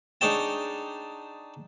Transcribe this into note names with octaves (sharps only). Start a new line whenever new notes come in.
D4 D#4 G#4 C#5 G5 A5